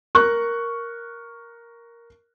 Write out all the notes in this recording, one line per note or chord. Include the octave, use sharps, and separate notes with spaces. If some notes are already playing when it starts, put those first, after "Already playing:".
A#4 C#6 F#6